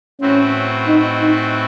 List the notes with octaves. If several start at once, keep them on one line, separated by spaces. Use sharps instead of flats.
A2 E3 C4 C#4 F#4
D#4
D#4